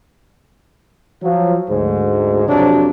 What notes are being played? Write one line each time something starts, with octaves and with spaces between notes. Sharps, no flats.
F3 F#3
D2 G#2
F2 C3 F#3 D4